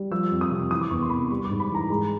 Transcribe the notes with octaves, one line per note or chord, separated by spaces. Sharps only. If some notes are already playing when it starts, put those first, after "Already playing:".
Already playing: G3
F3 E6
F2
D#6
C3
E3 D#6
D6
E2 C#6
C6
C3 B5
G3 C#6
D6
G#2
B5
E3 A#5
G#3